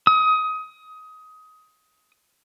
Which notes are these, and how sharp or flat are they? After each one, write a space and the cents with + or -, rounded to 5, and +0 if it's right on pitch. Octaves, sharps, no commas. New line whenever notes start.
D#6 +20